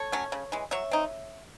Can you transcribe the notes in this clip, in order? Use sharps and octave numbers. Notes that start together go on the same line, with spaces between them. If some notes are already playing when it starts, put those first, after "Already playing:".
Already playing: A4 C#5
F#3 A3 C#4
C#3
E3 G#3
F#3 C#5 E5
C4 D#4